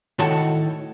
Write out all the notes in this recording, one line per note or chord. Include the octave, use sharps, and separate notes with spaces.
A2 D#3 F#4 A4 C#5 A5